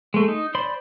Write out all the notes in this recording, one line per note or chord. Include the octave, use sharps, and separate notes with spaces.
G#3 A3
D#4
C5 D5 B5 C6